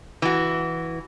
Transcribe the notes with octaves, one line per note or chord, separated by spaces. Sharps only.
E3 F#4